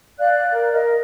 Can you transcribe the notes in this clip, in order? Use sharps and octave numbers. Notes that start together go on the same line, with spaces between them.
D5 F5 F#6
A#4
A#4 D#5